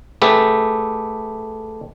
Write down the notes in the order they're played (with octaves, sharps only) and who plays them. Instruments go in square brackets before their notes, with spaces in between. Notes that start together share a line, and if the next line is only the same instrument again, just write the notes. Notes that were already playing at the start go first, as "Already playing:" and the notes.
[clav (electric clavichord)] A3 G4 G#4 B4 E5